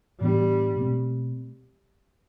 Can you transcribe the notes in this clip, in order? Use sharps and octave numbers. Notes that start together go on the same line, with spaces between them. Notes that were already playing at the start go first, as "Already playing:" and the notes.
A2 E3 G3 B3 D4
B2 A3 C4